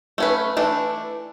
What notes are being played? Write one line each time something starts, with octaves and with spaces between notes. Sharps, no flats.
A3 C#4 B4
E3 A3 D4